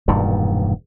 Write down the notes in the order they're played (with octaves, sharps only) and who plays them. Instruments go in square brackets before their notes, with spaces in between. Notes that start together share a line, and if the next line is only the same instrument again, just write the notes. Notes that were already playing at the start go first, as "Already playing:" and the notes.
[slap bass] E1 G2 A#2 D#3